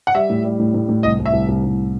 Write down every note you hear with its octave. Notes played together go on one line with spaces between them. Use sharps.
F#5
G3 E5
A2
G3
A2
A2
A2
C2 D#5
C2
E5
C2
C2
C2